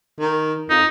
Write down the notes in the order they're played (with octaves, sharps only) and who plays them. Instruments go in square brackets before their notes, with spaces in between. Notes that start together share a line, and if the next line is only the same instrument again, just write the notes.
[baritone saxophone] D#3
[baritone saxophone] F2 [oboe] D#4